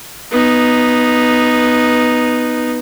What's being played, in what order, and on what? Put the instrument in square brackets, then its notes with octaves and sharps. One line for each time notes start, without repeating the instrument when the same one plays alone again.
[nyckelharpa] B3 D#4